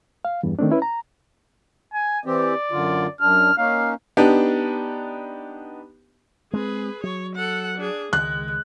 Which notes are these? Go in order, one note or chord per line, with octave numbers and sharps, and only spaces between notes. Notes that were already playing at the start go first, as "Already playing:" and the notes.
F5
E2 G2
D#3 A3 C4 D4
C#4 E4 B4
A#5
G#5
E3 C4 G4 D5
F#2 D3 F4
F#2 D4 F6
A#3 C#4 D#4 F5
B3 D4 D#4 G4
G#3 C4 G#4 B4
F#3 C#5
A4 F#5
D4 G#4
C#2 D#3 G#3 F#6